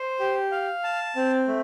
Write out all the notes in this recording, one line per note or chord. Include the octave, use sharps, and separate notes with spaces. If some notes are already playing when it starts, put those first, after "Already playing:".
Already playing: C5
G4
F5
A5
C4
A3